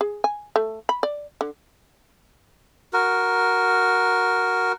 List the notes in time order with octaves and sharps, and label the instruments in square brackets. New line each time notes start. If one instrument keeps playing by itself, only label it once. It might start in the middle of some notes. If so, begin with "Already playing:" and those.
[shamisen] G#4
G#5
A3
B5
D5
D3
[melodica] F#4 A#4